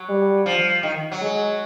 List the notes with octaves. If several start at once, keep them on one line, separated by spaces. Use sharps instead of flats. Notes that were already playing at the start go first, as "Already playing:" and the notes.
Already playing: F#3
G3
F3
D#3
F#3
G#3